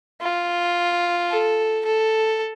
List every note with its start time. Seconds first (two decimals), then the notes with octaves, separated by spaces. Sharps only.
0.21 F4
1.30 A4
1.85 A4